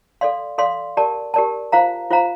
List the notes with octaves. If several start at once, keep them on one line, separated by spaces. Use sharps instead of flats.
A4 D5 F5 C6
A4 D5 F5 C6
G4 A#4 D5 A5
G4 A#4 D5 A5
F4 C5 F5 A#5
F4 C5 F5 A#5